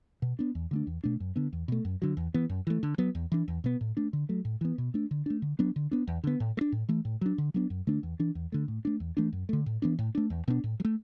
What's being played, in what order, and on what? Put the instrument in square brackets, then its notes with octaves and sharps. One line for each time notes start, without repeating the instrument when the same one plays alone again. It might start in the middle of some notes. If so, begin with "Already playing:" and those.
[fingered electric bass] B2
B3 D4
E2
D3 A3 D4
E2
B2 A3 D4
F#2
D3 B3
E2
B2 A3
F#2
D3 F#3
E2
E3 B3
F#2
E3 A3
D3
F#3 B3
E2
E3 D4
E2
B2 B3
A2
A3 D4
D3
F#3 A3
A2
E3 B3
B2
A3 D4
D3
A3 D4
D3
F#3 B3 D4
D3
B3 D4
E2
D3 B3
A2
A3
D4
A2
E3 A3
A2
F#3 D4
D3
F#3 B3 D4
F#2
D3 A3 D4
E2
E3 D4
E2
D3 A3
A2
A3 D4
E2
E3 A3 D4
F#2
D3 A3
A2
E3 B3 D4
A2
A3 D4
E2
B2 B3 D4
A2
F#3
A3